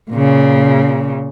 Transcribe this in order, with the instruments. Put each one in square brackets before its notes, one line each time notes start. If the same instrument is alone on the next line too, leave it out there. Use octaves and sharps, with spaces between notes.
[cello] A#2 C#3